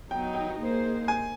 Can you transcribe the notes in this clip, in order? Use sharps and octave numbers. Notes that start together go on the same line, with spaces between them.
F#3 B3 D#4 G5
G5
A#3 D#4 G#4 C5
G#5